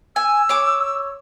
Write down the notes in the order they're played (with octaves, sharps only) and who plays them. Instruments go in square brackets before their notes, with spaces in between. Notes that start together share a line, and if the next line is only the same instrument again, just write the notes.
[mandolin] G#5 [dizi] E6
[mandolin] C#5 D6